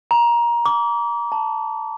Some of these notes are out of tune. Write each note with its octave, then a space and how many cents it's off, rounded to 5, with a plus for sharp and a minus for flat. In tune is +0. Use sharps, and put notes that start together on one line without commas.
A#5 +20
D6 -30
A5 +5